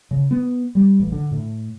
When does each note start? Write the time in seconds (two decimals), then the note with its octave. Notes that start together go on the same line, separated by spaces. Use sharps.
0.11 C#3
0.31 B3
0.75 G3
1.00 A1
1.12 D3
1.31 A2